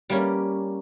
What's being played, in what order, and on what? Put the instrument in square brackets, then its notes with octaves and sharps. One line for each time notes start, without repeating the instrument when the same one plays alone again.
[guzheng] G3 A#3 C#4